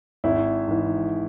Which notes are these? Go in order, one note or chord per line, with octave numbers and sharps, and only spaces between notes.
G#1 E4
G#2 E3